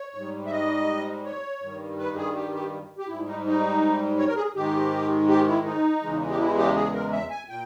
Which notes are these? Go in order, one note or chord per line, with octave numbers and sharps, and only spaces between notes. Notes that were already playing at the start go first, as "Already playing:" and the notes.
Already playing: C#5
G#2 G3
E5
D#5
C#5
G2 D#3 G3
B4
G#4
G4
G4
G4
G#2 G3 E4
D#4
D#4
C#5
A#4
G#4
G#2 D#3 G#3 G4
G4
E4
D#4
E2 C#3 E3 G#3
G4
E4
G4
G#4
A#4
E5
G#5
A#2 G5